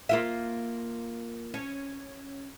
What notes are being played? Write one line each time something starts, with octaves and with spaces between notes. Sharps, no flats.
A#3 F4 E5
C#4